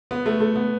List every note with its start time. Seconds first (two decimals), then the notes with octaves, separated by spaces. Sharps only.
0.11 B3
0.26 A3
0.40 A3
0.56 B3